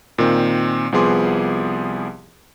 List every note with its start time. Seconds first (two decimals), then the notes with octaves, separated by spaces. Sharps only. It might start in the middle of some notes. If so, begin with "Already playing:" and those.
0.18 A#2 D#3 C4
0.92 C2 F3 B3 G#4 C6 D6